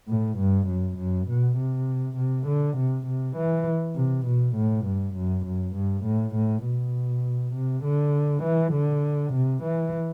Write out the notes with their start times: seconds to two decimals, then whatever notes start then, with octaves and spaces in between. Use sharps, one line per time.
0.08 A2
0.38 G2
0.68 F#2
0.98 F#2
1.28 B2
1.57 C3
2.16 C3
2.47 D3
2.77 C3
3.06 C3
3.36 E3
3.96 C3
4.26 B2
4.56 A2
4.85 G2
5.15 F#2
5.45 F#2
5.75 G2
6.04 A2
6.35 A2
6.64 B2
7.54 C3
7.84 D3
8.43 E3
8.73 D3
9.33 C3
9.63 E3